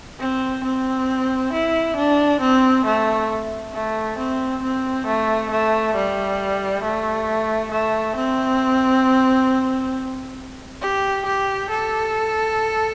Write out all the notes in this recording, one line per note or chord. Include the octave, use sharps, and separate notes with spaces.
C4
C4
E4
D4
C4
A3
A3
C4
C4
A3
A3
G3
A3
A3
C4
G4
G4
A4